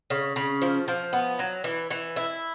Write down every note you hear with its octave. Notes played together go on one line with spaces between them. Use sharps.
C#3
C#3
F3
F3
B3
F#3
E3
E3
E4